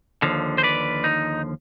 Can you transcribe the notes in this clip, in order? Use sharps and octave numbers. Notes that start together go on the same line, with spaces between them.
D#2 D3 F3
C5
B4 D5
D#4